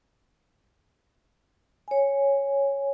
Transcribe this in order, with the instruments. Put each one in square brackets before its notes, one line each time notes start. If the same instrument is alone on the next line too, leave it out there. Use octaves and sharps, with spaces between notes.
[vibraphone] C#5 G#5